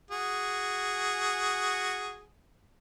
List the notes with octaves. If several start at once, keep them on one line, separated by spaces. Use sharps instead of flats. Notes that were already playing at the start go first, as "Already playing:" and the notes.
F#4 G#4